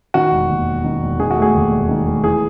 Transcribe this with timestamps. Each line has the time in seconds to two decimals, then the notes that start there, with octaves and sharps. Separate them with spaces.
0.14 D#3 F#4
0.32 E1
0.50 D#2
0.67 E1
0.84 D#3
1.02 E1
1.20 D#3 G#4
1.31 F#4
1.37 A3
1.42 G#4
1.54 D#2
1.72 E1
1.89 D#3
2.07 A3
2.23 E3 G#4